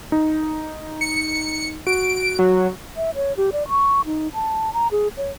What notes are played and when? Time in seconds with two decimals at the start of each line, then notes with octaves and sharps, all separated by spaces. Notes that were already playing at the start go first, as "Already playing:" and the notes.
0.12 D#4
1.01 C#7
1.87 F#4 D7
2.39 F#3
2.96 E5
3.15 C#5
3.37 G4
3.52 D5
3.69 C#6
4.05 D#4
4.34 A5
4.73 A#5
4.91 G#4
5.17 C#5